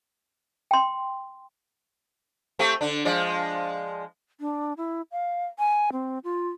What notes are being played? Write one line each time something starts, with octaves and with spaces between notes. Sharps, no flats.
G5 C6
A3 C4 G4
D3 D4
F3 G#3 D5
D4
E4
F5
G#5
C4
F4